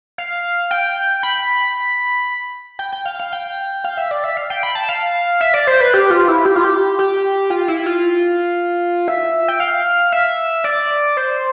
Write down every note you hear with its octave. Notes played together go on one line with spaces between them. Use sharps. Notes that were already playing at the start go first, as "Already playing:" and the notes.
F5
G5
B5
G5
G5
F5
F5
G5
F5
E5
D5
E5
F5
G5
B5
A5
F5
E5
D5
C5
B4
G4
F4
E4
G4
F4
G4
G4
F4
E4
F4
E5
G5
F5
E5
D5
C5